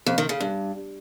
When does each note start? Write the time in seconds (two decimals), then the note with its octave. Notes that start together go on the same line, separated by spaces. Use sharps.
0.06 F2
0.18 D#3
0.29 C#3
0.40 G2